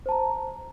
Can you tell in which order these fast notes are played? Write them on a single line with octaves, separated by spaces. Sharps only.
C5 A5 A#5